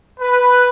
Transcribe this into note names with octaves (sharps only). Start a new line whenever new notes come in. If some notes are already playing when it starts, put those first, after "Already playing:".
B4